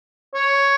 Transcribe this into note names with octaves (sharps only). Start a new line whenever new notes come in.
C#5